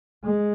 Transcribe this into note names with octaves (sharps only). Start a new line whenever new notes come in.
G#3